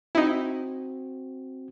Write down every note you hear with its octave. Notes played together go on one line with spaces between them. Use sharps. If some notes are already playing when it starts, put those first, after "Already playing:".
C4 D#4 E4 F#4